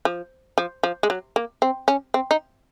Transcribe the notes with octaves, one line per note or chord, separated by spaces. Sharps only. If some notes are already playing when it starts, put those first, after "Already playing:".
F3
F3
F3
G#3
F#3
A#3
C4
C#4
C4
D#4